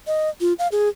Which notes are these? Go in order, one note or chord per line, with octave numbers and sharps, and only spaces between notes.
D#5
F4
F5
G#4